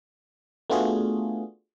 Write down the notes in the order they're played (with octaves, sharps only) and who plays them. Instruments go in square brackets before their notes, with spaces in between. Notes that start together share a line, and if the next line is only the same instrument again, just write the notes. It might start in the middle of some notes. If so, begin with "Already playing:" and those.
[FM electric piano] A3 B3 D4 F4 F#4 G#4